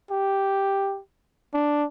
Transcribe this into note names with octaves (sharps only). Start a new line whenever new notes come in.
G4
D4